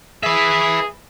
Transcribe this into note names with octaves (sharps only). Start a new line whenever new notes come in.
G#4 B4 E5